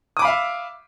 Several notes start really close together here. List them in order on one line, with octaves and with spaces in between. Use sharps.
D#6 D6 B5 F5 E5